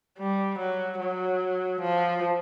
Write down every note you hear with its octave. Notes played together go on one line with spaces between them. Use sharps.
G3
F#3
F#3
F3